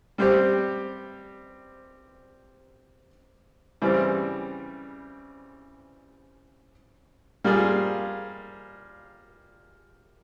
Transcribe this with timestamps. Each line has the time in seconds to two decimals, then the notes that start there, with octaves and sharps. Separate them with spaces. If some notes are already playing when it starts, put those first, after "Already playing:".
0.18 G3 C4 G4
3.82 C#3 E3 G3 C4
7.44 G3 A#3 F4 G#4